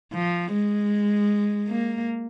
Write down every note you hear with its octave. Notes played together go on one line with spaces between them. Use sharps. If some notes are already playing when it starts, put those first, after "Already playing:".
F3
G#3
A#3